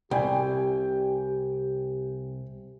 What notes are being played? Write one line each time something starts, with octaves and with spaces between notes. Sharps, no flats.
C2 G4 G5 G#5